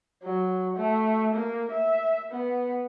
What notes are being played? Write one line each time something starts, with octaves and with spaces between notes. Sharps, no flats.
F#3
A3
A#3
E5
B3